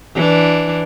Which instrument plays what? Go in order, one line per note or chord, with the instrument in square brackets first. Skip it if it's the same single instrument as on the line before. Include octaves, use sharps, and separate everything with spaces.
[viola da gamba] E3 D4